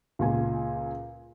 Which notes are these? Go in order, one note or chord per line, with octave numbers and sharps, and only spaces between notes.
C#2 A#2 G#5